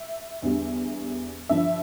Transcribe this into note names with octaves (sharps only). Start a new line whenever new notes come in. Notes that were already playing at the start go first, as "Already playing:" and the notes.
Already playing: E5
E2 D3 G3
G2 D3 F3 E5